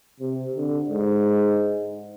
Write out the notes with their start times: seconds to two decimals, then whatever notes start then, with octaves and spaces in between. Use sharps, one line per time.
0.20 C3
0.55 D3
0.90 G#2